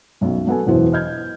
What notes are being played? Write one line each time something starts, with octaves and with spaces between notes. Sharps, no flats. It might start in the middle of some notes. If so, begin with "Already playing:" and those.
B1 F#2 B2
F#2 B3 A4 G#5
E1 F#2 E3 B3 E4 C5
D#5 F6 G6 G#6